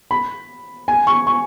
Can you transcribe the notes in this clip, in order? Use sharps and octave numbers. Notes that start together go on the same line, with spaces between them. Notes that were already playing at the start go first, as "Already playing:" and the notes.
B5
G#5
C#6
C#6